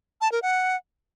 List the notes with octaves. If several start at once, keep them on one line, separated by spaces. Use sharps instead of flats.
A5
A#4
F#5